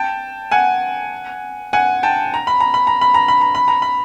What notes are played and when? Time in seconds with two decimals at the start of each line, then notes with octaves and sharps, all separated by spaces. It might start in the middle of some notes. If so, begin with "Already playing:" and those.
Already playing: G5 A5
0.51 F#5 G#5
1.73 F#5 G#5
2.03 G5 A5
2.34 A#5
2.47 B5
2.60 A#5
2.74 B5
2.87 A#5
3.01 B5
3.14 A#5
3.28 B5
3.41 A#5
3.55 B5
3.68 A#5
3.82 B5